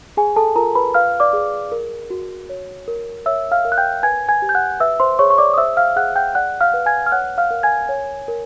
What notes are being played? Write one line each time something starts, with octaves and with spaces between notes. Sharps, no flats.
G#4 G#5
A4 A5
F4 A#4 A#5
B4 B5
B4 F5 F6
D5 D6
G#4
A#4
F#4
C#5
A#4
C#5 E5 E6
F5 F6
A#4
F#6
G5 G6
B4 G#5 G#6
G#5 G#6
G4
G6
F#5 F#6
B4 E5 E6
C5 C6
G#4 C#5 C#6
C#6
D5 D6
D#6
C5 E5 E6
F5 F6
G#4 F#5 F#6
G5 G6
D5 F#5 F#6
F5 F6
B4
G#5 G#6
F6
C#5 F#5 F#6
F5 F6
A#4
G#5 G#6
C#5
A#4